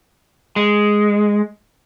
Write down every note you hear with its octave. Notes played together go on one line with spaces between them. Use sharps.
G#3